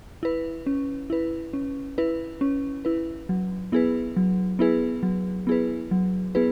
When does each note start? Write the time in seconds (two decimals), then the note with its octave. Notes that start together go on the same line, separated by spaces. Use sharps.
0.23 E4 B4
0.66 C#4
1.10 E4 B4
1.53 C#4
1.98 E4 B4
2.41 C#4
2.85 E4 B4
3.29 F#3
3.72 B3 E4 G#4 B4
4.17 F#3
4.59 B3 E4 G#4 B4
5.03 F#3
5.47 B3 E4 G#4 B4
5.91 F#3
6.35 B3 E4 G#4 B4